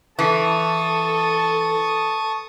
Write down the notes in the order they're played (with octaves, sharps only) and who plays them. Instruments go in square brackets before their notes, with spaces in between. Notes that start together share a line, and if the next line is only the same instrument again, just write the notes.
[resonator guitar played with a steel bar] E3 [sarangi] A4 [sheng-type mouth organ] A5 C#6 D#6